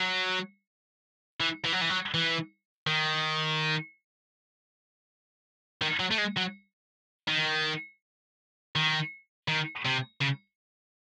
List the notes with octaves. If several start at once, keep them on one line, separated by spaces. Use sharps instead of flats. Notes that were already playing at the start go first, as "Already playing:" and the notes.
Already playing: F#3
E3
E3
F#3
E3
F#3
E3
D#3
D#3
F#3
A3
G#3
F#3
D#3
D#3
D#3
C3
C#3